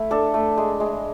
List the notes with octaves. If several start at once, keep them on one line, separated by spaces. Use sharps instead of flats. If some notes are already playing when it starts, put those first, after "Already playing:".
Already playing: A3 E4
D4 A4
A3
G#3
G#3